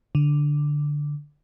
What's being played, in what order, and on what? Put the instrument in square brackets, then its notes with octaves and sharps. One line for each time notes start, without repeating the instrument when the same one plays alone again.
[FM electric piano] D3